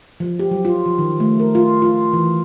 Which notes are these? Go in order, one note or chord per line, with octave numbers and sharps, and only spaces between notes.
F3
G4
F#3
F4
F3
D#3
A3
A#4
F4
F4
E3